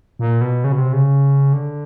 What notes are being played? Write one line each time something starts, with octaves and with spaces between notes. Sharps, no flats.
A#2
B2
C#3
B2
C3
C#3
D3